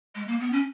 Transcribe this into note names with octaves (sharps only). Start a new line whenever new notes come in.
G#3
A#3
B3
C#4